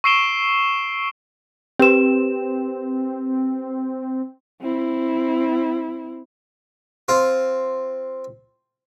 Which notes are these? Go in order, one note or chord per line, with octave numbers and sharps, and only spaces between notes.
C#6 E6 C7 D7 E7 G7
C4 G4 B4 E7
C4 E4
C4 F4